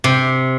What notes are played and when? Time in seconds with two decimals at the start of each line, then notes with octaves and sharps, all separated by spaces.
0.04 C3